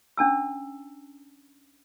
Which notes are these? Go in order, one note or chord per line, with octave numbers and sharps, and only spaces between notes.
C#4 D4 A5 E6